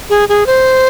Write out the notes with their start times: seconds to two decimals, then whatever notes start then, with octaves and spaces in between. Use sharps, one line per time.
0.10 G#4
0.29 G#4
0.46 C5